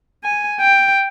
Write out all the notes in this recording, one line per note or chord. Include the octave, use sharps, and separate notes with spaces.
G#5
G5